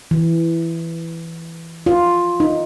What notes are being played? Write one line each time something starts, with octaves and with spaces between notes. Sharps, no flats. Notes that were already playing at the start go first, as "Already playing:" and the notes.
E3
F4
D#4